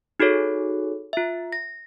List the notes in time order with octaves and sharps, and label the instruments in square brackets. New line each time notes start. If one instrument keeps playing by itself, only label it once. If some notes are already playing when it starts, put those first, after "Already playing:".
[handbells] D#4 F#4 G#4 A4 C#5
F4 E5
A#6